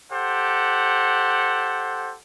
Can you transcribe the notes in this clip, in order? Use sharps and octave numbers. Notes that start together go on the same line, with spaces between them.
G4 A4 C5 F#5